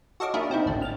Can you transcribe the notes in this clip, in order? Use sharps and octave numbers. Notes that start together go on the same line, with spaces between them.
F#4 A4 C#5 D#5 F5 D6
A#3 D4 E4 F#4 G#4 A#4
B2 C4 D#4 E4
A1 D2 D4
F6 A6